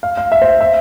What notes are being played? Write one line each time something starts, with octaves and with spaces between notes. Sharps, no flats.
F5
F5
E5
C5
E5